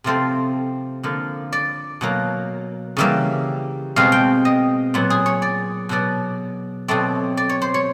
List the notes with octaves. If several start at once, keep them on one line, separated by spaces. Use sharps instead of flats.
C3 F3 A3 C4 C5
D3 F3 A#3
D5
B2 F#3 A#3
C#3 E3 G3 A#3 E5
B2 G#3 C4 F5
G5
D#5
A#2 F#3 B3
G#4
C#5
D5
B2 F#3 B3 D5
B2 F#3 A3 C4 D5
D5
C#5
C5
C#5